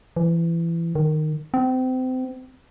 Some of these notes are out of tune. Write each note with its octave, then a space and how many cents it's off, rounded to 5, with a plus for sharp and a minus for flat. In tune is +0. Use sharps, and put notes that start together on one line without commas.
E3 +25
D#3 -15
C4 -30